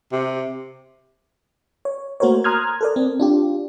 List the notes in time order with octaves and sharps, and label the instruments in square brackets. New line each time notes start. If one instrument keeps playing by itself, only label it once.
[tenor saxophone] C3
[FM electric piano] C#5
A3 A#3 F#4 A#4 C5 C#5
A#5 C6 D#6 F6 F#6 G#6
A4 A#4 D5
C4
D4 F4 G4